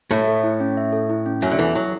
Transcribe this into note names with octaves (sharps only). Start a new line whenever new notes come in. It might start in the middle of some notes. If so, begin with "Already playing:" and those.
A2 A3 E5
A4
E4
C#4
E5
A4
E4
C#4
F#2 F#3 E5
D3
E2 E3 A4
F#3 E4